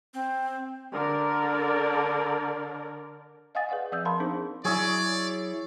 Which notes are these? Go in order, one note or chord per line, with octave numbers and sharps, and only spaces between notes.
C4
D3 A#4 D5
D#5 F5 F#5 G#5 D#6 A6
G#4 B4 D5 F5 F#5
F3 C4 D5 D#6 E6 G6
A#4 F5 A5 B5 C6
B3 C4 D4 D#4 G#4 C5
F#3 E4 G#4 C#5 D5 E6